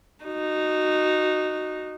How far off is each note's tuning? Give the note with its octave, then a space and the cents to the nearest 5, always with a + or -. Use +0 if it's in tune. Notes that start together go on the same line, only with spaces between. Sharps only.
D#4 -10 F#4 +0